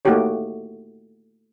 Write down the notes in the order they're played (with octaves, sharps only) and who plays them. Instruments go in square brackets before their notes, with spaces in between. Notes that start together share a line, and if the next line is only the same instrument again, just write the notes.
[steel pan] A3 A#3 D#4 F#4 G4 C#5